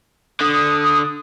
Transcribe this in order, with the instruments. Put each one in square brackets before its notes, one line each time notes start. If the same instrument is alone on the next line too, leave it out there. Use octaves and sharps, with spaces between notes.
[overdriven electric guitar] D3 [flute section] D#6